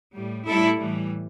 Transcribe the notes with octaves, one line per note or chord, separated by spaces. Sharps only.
A2 G3
A2 G3 E4 A4
A2 E3 G3